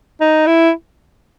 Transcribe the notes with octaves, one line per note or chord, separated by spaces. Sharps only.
D#4
E4